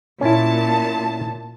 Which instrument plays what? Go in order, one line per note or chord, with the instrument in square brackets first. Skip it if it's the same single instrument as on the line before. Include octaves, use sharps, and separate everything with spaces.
[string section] A#2 A5 [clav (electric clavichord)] C#4 E4